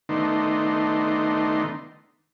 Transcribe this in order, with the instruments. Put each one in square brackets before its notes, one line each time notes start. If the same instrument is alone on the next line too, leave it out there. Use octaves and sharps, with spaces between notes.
[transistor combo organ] D#3 A3 B3 D4 D#4 C6